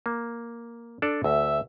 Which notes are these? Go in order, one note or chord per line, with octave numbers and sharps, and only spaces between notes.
A#3
D4 A4 D5
D2 E5